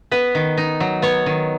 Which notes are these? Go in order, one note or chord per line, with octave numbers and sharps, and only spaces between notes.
B3 B4
D#3
D#4
F#3
B3 C#5
D#3